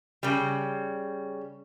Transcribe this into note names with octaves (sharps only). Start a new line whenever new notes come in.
C#3 G3